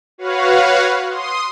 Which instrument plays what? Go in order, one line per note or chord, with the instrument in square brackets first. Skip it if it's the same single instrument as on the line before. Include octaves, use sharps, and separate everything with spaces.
[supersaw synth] F#4 B4 C#5 F5 F#5
C6 D#6